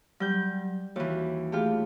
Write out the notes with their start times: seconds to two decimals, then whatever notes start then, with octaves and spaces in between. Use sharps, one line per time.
0.20 F#3 G3 G6
0.96 D#2 E3 F#4
1.52 A3 F4 G4 G#4 F5